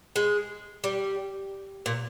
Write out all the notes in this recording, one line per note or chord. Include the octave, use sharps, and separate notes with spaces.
G#3
G3
A#2